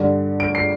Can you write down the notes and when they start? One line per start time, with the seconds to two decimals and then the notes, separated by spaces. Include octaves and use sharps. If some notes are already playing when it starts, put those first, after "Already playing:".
Already playing: G2 D3
0.40 D7
0.55 C7